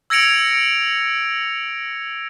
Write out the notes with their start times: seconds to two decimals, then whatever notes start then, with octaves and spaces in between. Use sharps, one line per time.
0.10 E6 G#6 A#6 C#7 D7 F7